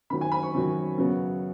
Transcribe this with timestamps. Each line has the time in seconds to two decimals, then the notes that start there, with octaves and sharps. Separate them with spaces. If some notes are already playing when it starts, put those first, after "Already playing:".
0.10 F#2 D#3 F#3 B5
0.21 G#5
0.32 B5
0.43 C#6
0.54 F#2 D#3 F#3
0.97 F#2 C#3 F#3 B3